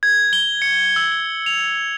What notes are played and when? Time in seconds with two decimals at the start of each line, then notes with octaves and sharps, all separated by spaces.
0.03 G#6
0.33 G7
0.62 C#7
0.96 E6
1.12 G7
1.46 F7